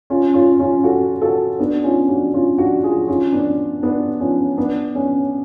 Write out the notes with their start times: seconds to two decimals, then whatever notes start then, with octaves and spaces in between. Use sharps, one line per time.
0.10 C#4 F4
0.34 C#4 F4
0.59 C#4 F4
0.84 F#4 A4
1.22 F#4 A4
1.59 B3 D4
1.84 C#4 F4
2.09 D4 F#4
2.33 C#4 F4
2.58 D4 F#4
2.83 F4 G#4
3.08 C#4 F4
3.33 B3 D4
3.83 B3 D4
4.20 C#4 F4
4.57 B3 D4
4.95 C#4